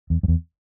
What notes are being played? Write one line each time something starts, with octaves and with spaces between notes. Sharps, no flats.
E2
F#2
E2